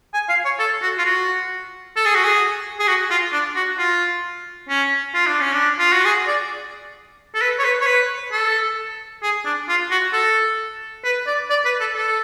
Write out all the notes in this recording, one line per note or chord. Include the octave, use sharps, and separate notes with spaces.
G#5
F5
C#5
A4
F#4
F4
F#4
A4
G#4
F#4
G#4
G#4
F#4
F4
D4
F#4
F4
C#4
F4
D4
C#4
D4
F4
F#4
G#4
D5
A4
B4
C#5
B4
C#5
B4
A4
G#4
D4
F4
F#4
A4
B4
D5
D5
B4
A4
A4